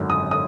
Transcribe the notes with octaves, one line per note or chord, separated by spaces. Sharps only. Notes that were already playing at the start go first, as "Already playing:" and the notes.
Already playing: G#1 F#2 D3 F#3
D#6
D#6